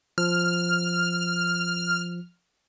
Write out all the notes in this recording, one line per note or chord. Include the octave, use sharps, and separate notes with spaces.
F3 F6